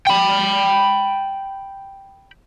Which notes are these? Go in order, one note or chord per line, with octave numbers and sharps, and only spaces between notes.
G5 B5